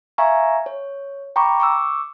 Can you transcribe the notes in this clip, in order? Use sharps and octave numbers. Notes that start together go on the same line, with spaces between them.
E5 F5 G#5 A#5 C#6
C#5
G5 A#5 B5 C#6 D6
C#6 D6 E6